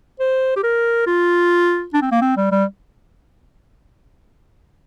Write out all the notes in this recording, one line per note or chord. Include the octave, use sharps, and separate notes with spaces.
C5
G4
A#4
F4
D4
C4
A#3
C4
G3
G3